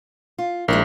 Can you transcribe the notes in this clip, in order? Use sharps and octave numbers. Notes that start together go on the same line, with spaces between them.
F4
A#1 G#3 E4 A#4